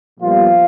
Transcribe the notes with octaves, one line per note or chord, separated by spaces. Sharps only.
A#2 F3 G3 B3 F4